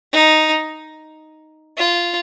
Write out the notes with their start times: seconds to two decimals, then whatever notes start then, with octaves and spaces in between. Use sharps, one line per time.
0.12 D#4
1.78 F4